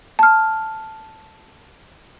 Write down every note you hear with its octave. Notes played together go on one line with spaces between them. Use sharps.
A5 F6